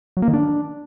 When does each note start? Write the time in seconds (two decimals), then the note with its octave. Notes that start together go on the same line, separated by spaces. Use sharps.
0.17 F#3
0.22 A#3
0.28 D#3
0.34 D4